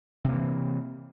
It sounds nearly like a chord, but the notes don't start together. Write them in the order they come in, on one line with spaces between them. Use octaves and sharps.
C3 A#3 E3